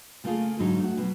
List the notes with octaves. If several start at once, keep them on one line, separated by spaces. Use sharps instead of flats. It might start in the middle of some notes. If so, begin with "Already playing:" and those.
C#3 A3 A#3 E4 F4 G#4
G#2 D3 F#3 D#4
A3 F#4
B2 F#3